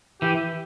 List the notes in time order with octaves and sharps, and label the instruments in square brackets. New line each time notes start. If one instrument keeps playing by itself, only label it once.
[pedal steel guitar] E3 [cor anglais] G4